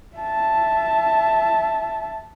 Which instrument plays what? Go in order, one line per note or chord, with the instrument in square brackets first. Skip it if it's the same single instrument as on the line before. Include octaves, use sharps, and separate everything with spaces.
[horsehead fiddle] E5 A5